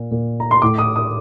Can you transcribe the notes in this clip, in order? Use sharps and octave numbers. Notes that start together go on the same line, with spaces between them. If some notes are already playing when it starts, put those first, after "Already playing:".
Already playing: A#2
A#2
A#5
C6
A2 D6
D#6
D#6